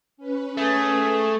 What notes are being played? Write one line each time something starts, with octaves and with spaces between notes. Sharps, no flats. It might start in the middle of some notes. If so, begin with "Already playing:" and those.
C#4 B4
A3 G#4